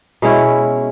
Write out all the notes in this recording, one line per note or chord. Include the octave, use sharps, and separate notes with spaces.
B2 G#3 C#4 E4